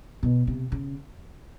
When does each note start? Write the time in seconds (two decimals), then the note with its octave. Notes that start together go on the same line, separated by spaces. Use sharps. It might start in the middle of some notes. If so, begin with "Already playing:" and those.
0.23 B2
0.47 C3
0.72 C#3